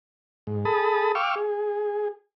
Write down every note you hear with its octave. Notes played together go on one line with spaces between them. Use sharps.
G#2
G#4 A4 A5 B5 D#6
F5 G5 C#6 D6 E6 F6
G#4